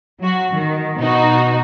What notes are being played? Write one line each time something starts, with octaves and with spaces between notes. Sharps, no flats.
F#3 F#4
D#3
B2 D#4 F#4